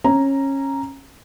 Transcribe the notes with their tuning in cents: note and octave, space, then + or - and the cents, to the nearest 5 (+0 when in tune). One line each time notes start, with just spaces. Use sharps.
C#4 -20 A#5 +0